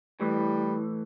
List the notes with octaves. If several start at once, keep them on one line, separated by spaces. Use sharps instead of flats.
A2 E3 G3